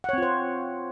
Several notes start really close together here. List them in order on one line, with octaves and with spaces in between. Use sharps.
F#5 C#5 C4 F4 C5